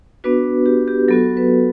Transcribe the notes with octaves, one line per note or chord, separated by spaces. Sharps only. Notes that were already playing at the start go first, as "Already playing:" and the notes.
B3 D4 F#4 B4
G4
G4
F#3 B3 F#4 A4
B4